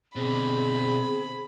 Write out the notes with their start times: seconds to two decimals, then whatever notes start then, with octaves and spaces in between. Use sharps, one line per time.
0.16 B2 D3 C4 G#4 B5